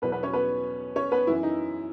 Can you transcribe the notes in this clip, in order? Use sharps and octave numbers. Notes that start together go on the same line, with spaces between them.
E2 B2 F#3 B3 B4
B3 B4
C#4 C#5
B3 B4
C#4 C#5
B3 B4
F#2 E3 E4
D#4